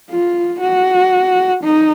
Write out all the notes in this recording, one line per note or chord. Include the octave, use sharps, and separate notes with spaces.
F4
F#4
D#4